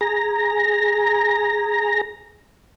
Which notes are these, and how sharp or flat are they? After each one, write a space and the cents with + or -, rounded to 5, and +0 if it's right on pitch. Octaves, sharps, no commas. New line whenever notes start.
G#4 +0 A#5 +0